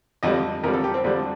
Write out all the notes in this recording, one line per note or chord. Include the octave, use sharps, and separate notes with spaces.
F2 D3 G3 D#5
F2 D3 G3 A#4
A4
G4
C4
F2 D3 G3 D4